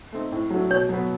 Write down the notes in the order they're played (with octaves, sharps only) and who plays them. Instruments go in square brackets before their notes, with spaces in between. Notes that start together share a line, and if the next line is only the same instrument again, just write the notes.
[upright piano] A3 C4 D#4
A2
F#3 A3 D4
[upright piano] B2 [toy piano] C#5
[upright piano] F#3 B3